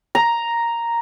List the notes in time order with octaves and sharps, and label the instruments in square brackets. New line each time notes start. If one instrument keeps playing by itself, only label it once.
[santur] A#5